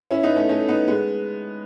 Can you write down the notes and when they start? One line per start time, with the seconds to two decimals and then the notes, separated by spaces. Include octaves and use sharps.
0.11 C#4 E4
0.23 B3 D#4
0.36 A3 C#4
0.49 A3 C#4
0.68 B3 D#4
0.88 G#3 B3